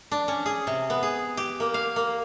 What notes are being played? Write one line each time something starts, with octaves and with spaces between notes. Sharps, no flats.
D4
C#4
G#4
C3
B3
G#4
G4
A#3
F5
A#3